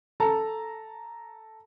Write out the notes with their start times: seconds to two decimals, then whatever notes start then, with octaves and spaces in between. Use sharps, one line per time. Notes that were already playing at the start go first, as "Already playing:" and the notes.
0.20 A4 A5 A#5